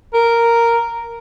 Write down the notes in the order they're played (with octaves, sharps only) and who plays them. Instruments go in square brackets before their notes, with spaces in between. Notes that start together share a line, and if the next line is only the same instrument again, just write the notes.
[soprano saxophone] A#4